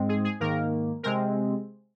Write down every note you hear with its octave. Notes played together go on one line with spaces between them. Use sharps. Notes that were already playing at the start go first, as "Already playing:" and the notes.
Already playing: G#2 G#3 C4
G#4
G#4
G#2 D#3 A#3 A#4
C3 G#3 C4 A#4